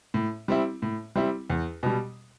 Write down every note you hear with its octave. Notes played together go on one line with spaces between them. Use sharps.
A2
G3 C4 E4
A2
G3 C4 E4
E2
B2 G3